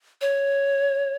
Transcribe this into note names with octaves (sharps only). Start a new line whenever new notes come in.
C#5